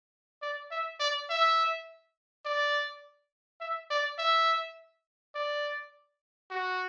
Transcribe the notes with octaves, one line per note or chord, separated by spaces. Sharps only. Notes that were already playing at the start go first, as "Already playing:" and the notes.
D5
E5
D5
E5
D5
E5
D5
E5
D5
F#4